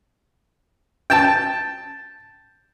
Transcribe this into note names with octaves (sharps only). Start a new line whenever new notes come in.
G5 A5